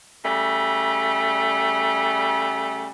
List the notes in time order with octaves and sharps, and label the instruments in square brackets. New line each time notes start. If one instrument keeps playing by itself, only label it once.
[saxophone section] C#3 G3 A3